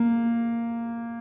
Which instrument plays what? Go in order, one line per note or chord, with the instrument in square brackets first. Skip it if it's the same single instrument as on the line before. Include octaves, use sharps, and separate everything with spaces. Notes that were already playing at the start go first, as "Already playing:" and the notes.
Already playing: [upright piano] A#3